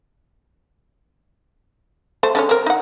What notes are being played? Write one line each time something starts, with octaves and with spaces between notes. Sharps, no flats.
A3 A4 C5
D3 G#3 C#4
C4 A#4
D#4 F#5